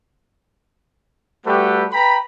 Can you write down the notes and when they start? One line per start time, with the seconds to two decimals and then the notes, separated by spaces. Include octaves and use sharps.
1.45 G3 A3 F#4 G4 A4 B4
1.91 B4 G5 A#5 B5